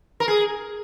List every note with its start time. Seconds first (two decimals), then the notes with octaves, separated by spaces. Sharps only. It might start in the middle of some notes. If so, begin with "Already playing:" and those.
0.20 A#4
0.28 G#4